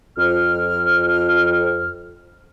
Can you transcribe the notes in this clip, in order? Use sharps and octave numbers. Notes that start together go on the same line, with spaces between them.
F2 F6